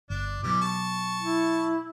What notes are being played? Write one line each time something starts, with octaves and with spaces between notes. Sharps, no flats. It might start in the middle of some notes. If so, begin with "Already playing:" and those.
G1 D4
B2 E3 F#3 G3 D6
A5 C#6
E4